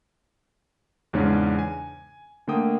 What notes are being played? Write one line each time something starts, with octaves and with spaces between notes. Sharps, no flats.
E2 G#2 C#3 G#3 C#4 D4
G#5
D3 A3 A#3 G5 D#6